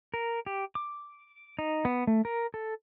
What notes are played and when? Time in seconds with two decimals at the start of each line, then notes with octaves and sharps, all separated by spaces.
0.14 A#4
0.46 G4
0.75 D6
1.59 D#4
1.85 B3
2.07 A3
2.25 A#4
2.54 A4